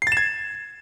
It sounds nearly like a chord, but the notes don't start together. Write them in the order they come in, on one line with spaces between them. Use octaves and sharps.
C7 A6 E7 G#6